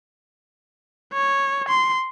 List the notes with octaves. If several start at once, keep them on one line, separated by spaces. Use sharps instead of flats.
C#5
C6